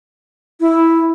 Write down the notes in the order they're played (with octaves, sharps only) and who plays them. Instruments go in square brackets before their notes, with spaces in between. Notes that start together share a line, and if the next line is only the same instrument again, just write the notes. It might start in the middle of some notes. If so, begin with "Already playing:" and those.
[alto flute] E4